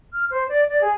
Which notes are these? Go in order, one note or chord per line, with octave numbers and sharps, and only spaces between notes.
F6
C5
D5
D5
G#4